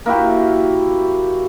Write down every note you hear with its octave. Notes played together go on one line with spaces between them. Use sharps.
A#3 E4 F#4 G4